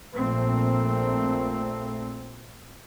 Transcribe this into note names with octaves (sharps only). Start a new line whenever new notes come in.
A#1 A#2 A3 C4